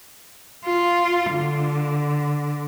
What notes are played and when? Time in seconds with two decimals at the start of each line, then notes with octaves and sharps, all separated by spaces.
0.66 F4
1.33 D3